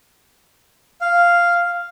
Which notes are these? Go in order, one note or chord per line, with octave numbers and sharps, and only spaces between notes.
F5